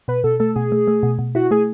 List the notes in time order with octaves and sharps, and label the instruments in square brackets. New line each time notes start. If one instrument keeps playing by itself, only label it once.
[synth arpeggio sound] B2 [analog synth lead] B4
[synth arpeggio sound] B2 [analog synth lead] A4
[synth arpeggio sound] A3 [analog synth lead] A4
[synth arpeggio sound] B2 [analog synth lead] G#4
[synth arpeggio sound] A3
A3
B2
B2
[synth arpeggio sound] E4 [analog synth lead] F#4
[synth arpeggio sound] A3 [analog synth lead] G#4